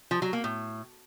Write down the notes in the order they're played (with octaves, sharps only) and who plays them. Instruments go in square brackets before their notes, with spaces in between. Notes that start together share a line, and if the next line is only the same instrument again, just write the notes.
[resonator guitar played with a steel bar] F3
F#3
A#3
A2